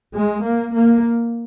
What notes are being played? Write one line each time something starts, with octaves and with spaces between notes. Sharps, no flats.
G#3
A#3
A#3